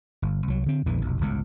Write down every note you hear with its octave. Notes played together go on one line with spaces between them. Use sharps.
G1
C2 F#3
D3 C4
A#1 E2 D3 E3
F1 B1
G1 C#2 A2